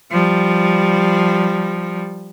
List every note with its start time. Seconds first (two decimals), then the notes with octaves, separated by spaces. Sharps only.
0.11 F3 G3